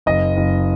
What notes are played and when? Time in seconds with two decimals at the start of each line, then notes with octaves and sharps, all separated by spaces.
0.06 F#1 D#5
0.37 F#1